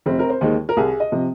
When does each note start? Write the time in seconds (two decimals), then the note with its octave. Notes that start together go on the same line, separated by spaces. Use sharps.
0.06 F1 C4
0.19 A#4
0.30 C5
0.41 D#2 D#3 G#3
0.69 A#4
0.77 C2 G#4
1.00 D#5
1.12 C3 F3